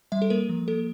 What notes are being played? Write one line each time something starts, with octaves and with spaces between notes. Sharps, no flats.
G3 E5
A4
A#3 A#4
F3
A#3 A4